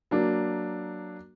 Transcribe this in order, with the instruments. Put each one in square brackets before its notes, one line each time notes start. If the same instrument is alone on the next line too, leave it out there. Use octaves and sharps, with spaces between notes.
[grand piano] F#3 A#3 D4